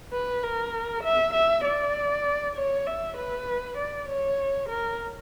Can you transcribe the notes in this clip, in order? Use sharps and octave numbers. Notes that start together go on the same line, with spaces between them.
B4
A#4
E5
E5
D5
C#5
E5
B4
D5
C#5
A#4